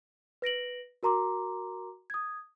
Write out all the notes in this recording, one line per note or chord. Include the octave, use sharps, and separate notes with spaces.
B4 A#6 D7 F#7
F#4 A#4 A#5 C6 D6
D#6 G#6